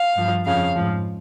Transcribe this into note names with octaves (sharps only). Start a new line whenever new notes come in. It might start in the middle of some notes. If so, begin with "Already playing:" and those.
Already playing: F5
G2 F3
F2 C#3 F3 F5
G#2 F3